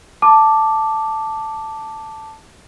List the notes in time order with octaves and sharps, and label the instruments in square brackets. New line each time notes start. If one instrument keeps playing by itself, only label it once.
[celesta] A5 D6